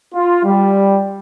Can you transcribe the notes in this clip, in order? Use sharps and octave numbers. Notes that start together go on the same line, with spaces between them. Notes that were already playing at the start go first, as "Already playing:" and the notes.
F4
G3